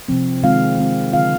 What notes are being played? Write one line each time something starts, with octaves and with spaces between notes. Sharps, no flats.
C3 F3 C4
D#3 G#3 C4 F4 F5
D#3 G#3 C4 F4
D3 F3 C4 F4 F5